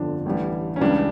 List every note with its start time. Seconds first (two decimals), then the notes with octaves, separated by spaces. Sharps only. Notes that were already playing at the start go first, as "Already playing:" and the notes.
Already playing: G1 F2 D3 F3 D4
0.26 A1 A2 E3 G3
0.76 C#4
0.81 C#2 C#3 E3 G3 D4